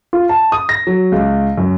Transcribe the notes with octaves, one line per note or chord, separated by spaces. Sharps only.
F4
A5
D#6
A#6
F#3
C#2
F#2